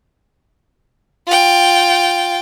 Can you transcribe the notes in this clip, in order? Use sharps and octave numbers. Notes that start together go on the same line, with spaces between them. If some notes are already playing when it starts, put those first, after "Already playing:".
F4 G5